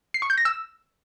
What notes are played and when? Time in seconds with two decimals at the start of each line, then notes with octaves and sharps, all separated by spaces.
0.14 C7
0.22 C#6
0.30 G6
0.38 A#6
0.45 E6